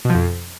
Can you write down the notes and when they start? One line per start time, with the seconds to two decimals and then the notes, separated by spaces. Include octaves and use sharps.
0.05 B2
0.10 F3
0.15 F2